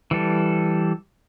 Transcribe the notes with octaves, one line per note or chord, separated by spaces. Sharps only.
E3 G3 A4